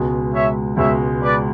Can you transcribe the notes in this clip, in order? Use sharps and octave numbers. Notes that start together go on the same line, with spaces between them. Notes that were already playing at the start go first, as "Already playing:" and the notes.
Already playing: C#2 B2 G#3
C#5 E5
C#2 B2 G#3 C#5 E5
B4 D5